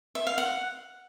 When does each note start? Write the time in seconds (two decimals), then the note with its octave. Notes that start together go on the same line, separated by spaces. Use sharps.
0.15 E5
0.27 F5
0.38 F#5